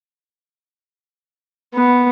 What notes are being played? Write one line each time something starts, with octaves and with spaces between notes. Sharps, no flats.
B3